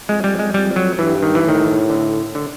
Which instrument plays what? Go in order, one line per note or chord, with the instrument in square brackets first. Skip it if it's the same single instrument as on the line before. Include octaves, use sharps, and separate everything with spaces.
[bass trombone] F2 [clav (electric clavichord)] G#3
[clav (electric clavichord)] G3
G#3
[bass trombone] F2 [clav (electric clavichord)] G3
[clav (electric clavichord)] F#3
[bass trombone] G2 [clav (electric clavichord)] E3
[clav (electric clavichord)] D#3
E3
[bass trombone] A2 [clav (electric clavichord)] D#3
[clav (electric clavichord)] D3
D3